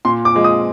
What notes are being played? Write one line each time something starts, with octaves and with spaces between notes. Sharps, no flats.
A#2 C6
D6
F3 G#3
D#6